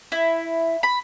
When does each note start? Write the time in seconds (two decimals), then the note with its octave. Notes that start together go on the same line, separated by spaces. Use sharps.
0.12 E4
0.83 B5